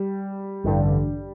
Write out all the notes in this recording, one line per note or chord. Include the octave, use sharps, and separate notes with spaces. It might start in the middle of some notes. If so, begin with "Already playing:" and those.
Already playing: G3
A1 G2 D3